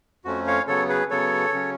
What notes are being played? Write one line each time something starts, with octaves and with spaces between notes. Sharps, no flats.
F2 F3 A3 C#4 F#4
C#5 F5
C#3 F#3 B3 A4 C#5
G#4 B4
C#3 F#3 B3 A4 C#5
C#3 F#3 C#4